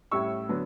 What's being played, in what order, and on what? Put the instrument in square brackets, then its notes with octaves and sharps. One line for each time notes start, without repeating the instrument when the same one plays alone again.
[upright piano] A2 G3 C#4 E4 C#6 E6
D3 F#3 B3